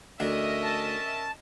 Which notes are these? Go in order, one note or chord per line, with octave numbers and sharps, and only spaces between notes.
D2 C#4 D4 A#4 D#5 E5
A5